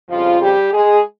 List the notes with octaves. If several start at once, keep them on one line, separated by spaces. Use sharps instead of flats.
F2 C#3 F3 G3 C4 F4
G3 G4
G#3 G#4